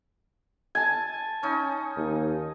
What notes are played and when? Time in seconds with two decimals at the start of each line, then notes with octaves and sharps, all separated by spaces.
0.75 G#5 A5
1.43 C#4 D#4
1.97 D#2